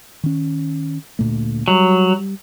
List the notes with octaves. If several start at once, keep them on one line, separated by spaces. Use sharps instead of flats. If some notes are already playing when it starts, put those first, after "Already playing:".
D#3 C#4
D2 A#2 A3
F#3 G3